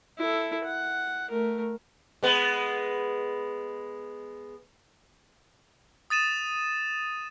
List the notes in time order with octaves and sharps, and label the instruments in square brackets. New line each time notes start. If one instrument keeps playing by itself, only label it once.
[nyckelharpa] E4 A4
F#5
A3 A#4
[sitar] G#3 B3
[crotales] D#6 A6 D#7 E7